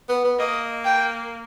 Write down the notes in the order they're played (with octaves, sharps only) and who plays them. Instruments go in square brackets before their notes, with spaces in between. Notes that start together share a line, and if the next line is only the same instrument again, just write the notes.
[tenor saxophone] B3
B3
[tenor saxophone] A#3 [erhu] D#5
[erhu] G5